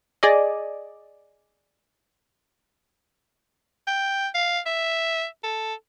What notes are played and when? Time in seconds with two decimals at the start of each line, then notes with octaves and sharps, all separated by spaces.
0.23 G#4 D5 D#5
3.87 G5
4.34 F5
4.66 E5
5.43 A4